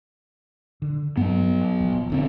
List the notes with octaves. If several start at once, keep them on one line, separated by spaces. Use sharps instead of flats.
D3
G2 F#3 B3
D#1 F3
F1 D3 C4